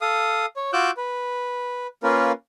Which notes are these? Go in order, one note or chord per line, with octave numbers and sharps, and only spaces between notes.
A4 F5 D#6
C#5
F4 F#4 D6 E6 F#6 G6
B4
A#3 C#4 F4 A#4 B4